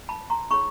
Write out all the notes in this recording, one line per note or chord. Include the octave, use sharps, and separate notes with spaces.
A5 B5
A#5 C6
D#4 G#4 C#5 B5 C#6